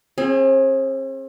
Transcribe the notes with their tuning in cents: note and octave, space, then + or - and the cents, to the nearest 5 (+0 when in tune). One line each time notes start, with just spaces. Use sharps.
C4 +45 G#4 +0